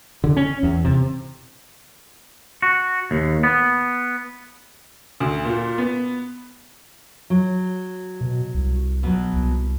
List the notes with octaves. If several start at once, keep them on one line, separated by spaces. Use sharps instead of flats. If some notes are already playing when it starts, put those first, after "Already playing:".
D3
C#4
E2
C3
F#4
D#2
B3
D2
A#2
B3
F#3
B2
C2
B2 F#3
C2